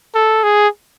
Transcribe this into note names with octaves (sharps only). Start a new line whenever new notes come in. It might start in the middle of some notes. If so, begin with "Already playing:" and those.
A4
G#4